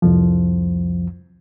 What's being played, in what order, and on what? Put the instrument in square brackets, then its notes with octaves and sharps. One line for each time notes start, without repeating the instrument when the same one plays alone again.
[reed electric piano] C2 F2 F3